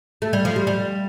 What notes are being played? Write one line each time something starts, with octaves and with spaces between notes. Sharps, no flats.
A3
G3
F3
G3
G3